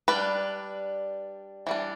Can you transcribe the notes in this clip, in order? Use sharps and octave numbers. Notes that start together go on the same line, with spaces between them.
G3 D4 B4
E3 G3 D4